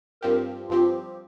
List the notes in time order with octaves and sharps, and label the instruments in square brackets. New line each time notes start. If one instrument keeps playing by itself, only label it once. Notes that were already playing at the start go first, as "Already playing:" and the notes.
[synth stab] G2 F3 C4 G4 [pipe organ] A#4
[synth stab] G2 F3 C4 G4 [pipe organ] F4